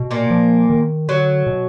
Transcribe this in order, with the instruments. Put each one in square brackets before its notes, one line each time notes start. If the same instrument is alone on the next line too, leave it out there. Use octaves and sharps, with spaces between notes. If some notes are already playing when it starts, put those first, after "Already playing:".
Already playing: [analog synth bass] B2
[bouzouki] A#2 A#3
[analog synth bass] F3
D#3
[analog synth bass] D3 [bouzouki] F#3
[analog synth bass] B2